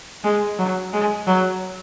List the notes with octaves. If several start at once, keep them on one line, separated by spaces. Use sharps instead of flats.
G#3
F#3
G#3
F#3